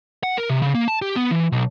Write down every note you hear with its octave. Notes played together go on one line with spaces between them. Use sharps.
F#5
A#4
C3
C#3
A#3
A5
G4
B3
E3
B1